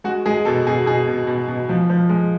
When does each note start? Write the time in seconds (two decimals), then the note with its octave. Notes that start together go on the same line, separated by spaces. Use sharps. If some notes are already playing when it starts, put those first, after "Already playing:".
0.04 G#3 F#4
0.26 G#3 G#4
0.45 B2 A4
0.67 B2 G#4
0.86 B2 G#4
1.08 B2
1.27 B2
1.48 B2
1.69 F3
1.90 F3
2.09 G#3